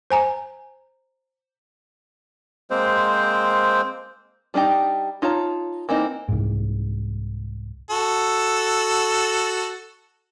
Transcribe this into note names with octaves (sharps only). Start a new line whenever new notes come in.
C5 G#5 A#5
G#3 A#3 C4 C5
G3 D4 D#4 G4
D#4 F4 C#5 A5 A#5
E3 A#3 C4 D#4
C2 G#2
F#4 A4